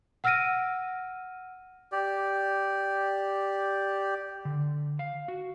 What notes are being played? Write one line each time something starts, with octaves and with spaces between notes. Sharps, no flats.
F#5 E6 F6 A#6 D7 D#7
G4 D5
D3
F5
F#4